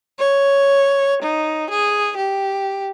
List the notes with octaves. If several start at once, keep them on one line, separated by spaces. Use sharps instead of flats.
C#5
D#4
G#4
G4